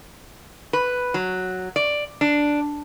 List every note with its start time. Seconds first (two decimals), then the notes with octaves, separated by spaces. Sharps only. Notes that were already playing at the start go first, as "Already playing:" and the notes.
0.73 B4
1.14 F#3
1.76 D5
2.21 D4